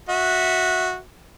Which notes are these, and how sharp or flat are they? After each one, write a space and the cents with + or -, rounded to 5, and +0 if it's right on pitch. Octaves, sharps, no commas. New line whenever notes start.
F#4 -10 E5 -15